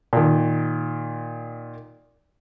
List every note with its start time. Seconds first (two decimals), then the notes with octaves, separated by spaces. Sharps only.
0.13 A#2 D#3